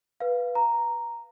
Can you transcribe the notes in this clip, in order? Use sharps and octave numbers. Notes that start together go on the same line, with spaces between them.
B4 F5
A#5